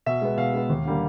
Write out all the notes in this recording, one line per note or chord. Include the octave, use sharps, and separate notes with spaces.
B2 E5
G#3 B3
B2 F5
G#3 B3
D#2
D3 G3 A#3